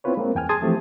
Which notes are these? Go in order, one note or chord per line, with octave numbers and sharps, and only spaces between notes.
B3 C4 E4 F4 B4 C#5
G#3 A#3 C4
E2 G5 G#5 F6
G#4 A5 C6 D#6 G#6 A6
E3 F3 A3 C4 G4